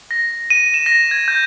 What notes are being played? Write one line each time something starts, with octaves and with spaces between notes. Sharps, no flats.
A#6
D#7
E7
A#6
G#6
G6